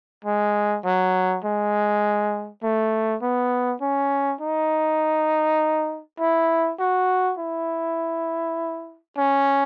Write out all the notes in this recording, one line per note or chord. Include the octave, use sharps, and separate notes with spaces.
G#3
F#3
G#3
A3
B3
C#4
D#4
E4
F#4
E4
C#4